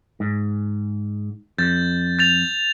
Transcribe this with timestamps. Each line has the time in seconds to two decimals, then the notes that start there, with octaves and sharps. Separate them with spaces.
0.20 G#2
1.58 F2 G6 A6
2.19 G6 A6 F7